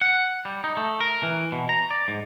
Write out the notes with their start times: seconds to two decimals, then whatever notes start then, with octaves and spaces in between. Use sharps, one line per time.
0.01 F#5
0.45 G3
0.64 D#4
0.77 A3
1.00 A#4
1.23 E3
1.52 B2
1.69 A#5
1.91 D5
2.08 G#2